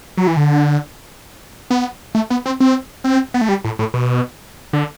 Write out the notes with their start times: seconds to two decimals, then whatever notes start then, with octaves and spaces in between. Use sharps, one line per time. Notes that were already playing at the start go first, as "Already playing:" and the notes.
0.18 F#3
0.27 E3
0.37 D3
1.70 B3
2.15 A3
2.30 B3
2.46 C4
2.60 C4
3.04 C4
3.34 B3
3.41 A3
3.49 G3
3.65 A2
3.79 A2
3.94 B2
4.73 D3